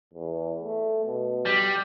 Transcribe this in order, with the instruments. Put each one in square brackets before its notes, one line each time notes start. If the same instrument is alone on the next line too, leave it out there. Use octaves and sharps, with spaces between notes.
[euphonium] E2
A3
B2
[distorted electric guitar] G3